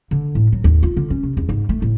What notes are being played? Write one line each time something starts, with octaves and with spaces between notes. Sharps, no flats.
D3
A2
F#3
D#2
F4
D3
C#4
C3
E2
G#2
A3
A2